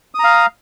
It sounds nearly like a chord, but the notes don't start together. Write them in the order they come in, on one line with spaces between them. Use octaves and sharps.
D#6 A#5 F5